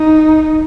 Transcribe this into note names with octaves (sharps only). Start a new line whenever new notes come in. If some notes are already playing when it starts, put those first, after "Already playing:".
Already playing: D#4